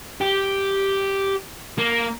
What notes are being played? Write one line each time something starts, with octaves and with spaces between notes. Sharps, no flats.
G4
A#3